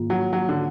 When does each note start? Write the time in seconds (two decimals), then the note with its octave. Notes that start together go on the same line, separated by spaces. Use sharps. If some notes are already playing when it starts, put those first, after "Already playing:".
Already playing: G#2 D#3 A#3 F4
0.10 F#3
0.33 F#3
0.49 D3